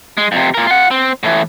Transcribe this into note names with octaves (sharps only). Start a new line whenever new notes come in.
G#3
F2 C3
A#2 A#4
F4 F#5
C4
A2 E3